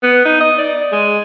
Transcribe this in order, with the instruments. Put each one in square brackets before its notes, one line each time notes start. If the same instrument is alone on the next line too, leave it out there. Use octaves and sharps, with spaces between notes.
[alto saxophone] B3
D#4
D#5
D5
G#3